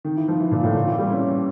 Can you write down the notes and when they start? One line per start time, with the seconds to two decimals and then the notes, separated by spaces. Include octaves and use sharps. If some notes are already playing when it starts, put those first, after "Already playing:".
0.05 D#3
0.17 E3
0.28 F3
0.40 E3
0.52 A#2
0.64 A2
0.75 A#2
0.87 E3
0.99 G3
1.10 C#4